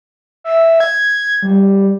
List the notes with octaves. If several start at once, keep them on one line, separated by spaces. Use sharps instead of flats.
E5
G#6
G3